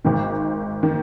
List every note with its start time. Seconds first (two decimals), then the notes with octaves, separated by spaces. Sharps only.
0.04 G#1 G#2 D#3
0.83 D#3